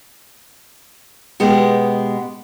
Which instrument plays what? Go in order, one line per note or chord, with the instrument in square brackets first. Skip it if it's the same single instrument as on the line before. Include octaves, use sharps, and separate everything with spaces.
[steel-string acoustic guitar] B2 G#3 B3 G4